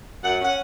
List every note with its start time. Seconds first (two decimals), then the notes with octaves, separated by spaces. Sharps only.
0.24 F#2 F#5
0.41 C#4 F#5